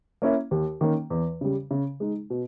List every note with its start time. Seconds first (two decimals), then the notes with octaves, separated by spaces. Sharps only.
0.22 A#3 C#4 E4
0.51 D#2
0.81 D#3 A#3 C#4
1.10 E2
1.41 C#3 G3
1.71 C#3
2.00 G#3 D#4
2.30 B2